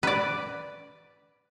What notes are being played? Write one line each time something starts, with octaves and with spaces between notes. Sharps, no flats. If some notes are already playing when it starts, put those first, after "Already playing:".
B4 D5